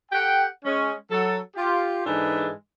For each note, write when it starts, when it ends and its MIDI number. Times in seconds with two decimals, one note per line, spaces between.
0.12 0.45 67
0.12 0.45 69
0.12 0.45 78
0.12 0.45 79
0.65 0.93 56
0.65 0.93 61
1.11 1.39 54
1.11 1.39 69
1.57 2.03 65
1.57 2.03 67
2.05 2.49 44
2.05 2.49 52
2.05 2.49 56
2.05 2.49 62
2.05 2.49 69
2.05 2.49 71